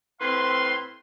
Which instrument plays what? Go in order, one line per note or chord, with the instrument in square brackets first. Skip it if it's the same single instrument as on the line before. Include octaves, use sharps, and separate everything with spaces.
[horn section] A2 C4 B4 F5 C6